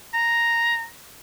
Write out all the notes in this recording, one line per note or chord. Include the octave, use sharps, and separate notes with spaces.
A#5